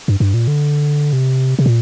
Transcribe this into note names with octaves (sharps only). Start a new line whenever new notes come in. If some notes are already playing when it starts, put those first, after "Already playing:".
G2
G2
A#2
D3
C3
C3
A#2